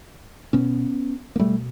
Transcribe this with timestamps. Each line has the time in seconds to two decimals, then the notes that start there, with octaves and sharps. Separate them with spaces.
0.53 B2 B3 C#4
1.36 A#3
1.39 B2 G3 A3